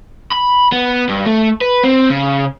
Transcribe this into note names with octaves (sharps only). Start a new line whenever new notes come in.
B5
B3
G2
A3
B4
C4
C#3